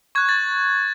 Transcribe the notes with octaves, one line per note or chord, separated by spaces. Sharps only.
C#6 F#6 G#6
A6